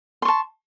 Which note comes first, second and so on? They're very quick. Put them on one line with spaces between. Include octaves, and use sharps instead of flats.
C6 C#6 A5